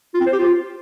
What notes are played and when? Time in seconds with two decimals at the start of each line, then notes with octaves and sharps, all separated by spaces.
0.14 F4
0.20 C4
0.27 C5
0.33 G4
0.39 F4